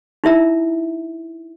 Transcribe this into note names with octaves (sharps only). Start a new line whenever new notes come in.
D#4 E4 E5 A#5